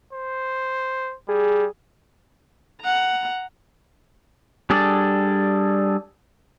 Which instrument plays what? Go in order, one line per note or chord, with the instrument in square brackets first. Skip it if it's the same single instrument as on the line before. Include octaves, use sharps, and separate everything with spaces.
[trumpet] C5
[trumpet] G3 [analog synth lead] G#4
[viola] F#5 A#5
[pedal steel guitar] G3 D4 G#4 A4 D5